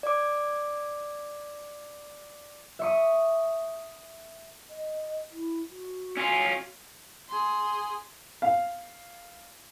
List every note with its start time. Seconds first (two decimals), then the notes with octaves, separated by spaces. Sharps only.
0.03 D5 D6
2.79 E5 C#6 D#6
4.68 D#5
5.32 E4
5.70 F#4
6.17 C#4 F4
7.29 G#4 C6
8.42 F5